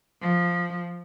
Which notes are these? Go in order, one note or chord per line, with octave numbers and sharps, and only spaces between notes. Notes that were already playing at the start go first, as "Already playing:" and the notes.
F3